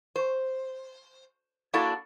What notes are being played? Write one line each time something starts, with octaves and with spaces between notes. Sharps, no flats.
C5
A#3 D4 E4 F#4 A4 D5